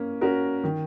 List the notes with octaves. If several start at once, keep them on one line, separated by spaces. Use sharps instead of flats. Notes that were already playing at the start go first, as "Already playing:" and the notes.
Already playing: A#3 C#4
C#4 F#4 A#4
D#3